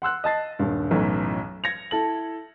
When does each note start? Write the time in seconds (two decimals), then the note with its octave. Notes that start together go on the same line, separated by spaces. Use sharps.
0.02 F#5 C6 E6 F#6
0.24 D#5 A5 A6 C7
0.59 D#1 G2
0.91 B1 F#2 A2 E3
1.64 G#6 A#6 C#7 F7
1.91 E4 A4 F#7